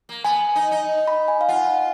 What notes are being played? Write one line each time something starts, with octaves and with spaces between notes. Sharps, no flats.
A#3
B3 G#5
D#4
D#4
B5
G#5
F5
F4 F#5